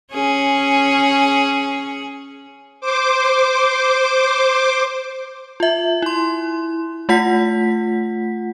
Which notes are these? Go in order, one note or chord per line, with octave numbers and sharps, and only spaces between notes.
C#4 G#4
C5 D6
F4 E5
E4 C6
A3 F4 F#5 B6